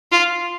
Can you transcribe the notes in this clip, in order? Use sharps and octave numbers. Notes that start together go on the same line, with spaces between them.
F4